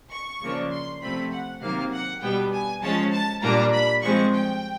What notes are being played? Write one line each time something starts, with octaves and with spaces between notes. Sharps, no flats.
C#6
C#3 F3 A#3 D4
C6
C3 F3 A3 C4 B5
F#5
C3 D#3 F#3 A#3 F5
F#5
B2 G3 B3 D4 G5
G#5
F3 G#3 C#4 A5
A5
A#2 G3 A#3 D4 A#5
B5
F3 G#3 C4 C#6
G5